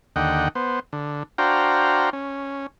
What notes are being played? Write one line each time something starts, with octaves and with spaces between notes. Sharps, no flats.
D#2 D3 D#5 F#5 G5
B3 C5
D3
D4 F#4 C5 F5 G5 A#5
C#4